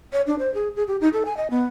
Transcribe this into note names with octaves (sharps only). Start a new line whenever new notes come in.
C#5
D4
C5
G#4
G#4
G4
D#4
A4
G#5
D#5
B3